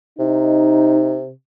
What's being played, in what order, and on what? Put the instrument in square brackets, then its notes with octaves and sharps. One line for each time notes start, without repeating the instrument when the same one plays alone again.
[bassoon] C3 [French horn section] D#4